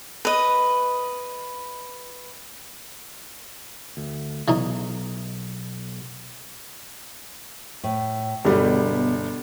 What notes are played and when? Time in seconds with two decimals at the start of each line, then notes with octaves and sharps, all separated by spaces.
0.25 B4 D#5
3.97 D2
4.48 B1 E3 C#4 D#4
7.83 A2
8.45 G1 B2 G3 G#3